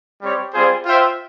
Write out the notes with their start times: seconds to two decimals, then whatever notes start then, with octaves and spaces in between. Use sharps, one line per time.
0.21 G3 C4 G4 C#5
0.53 G3 C4 F4 G#4 C5
0.84 F4 C5 E5 G5